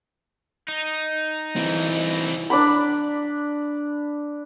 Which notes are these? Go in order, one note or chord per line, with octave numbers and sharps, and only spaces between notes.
D#4
E3 C4
D4 D5 B5